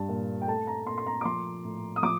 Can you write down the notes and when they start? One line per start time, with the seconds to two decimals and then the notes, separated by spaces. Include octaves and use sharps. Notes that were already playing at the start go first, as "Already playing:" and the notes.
Already playing: G2 G3 A5
0.09 A#2
0.42 G5
0.47 A3 A5
0.67 A#5
0.86 A#2 C6
0.98 C6
1.06 A#5
1.21 D6
1.25 F3 C6
1.65 A2
1.96 D#6
2.03 F3 D6